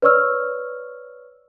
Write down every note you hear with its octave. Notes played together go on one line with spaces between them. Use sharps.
B4 C#5 D5 C#6 E6 F6